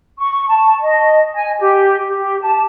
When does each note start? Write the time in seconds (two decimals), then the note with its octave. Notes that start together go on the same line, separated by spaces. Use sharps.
0.18 C#6
0.49 A5
0.81 D#5
1.34 G#5
1.59 G4
2.08 G4
2.41 A5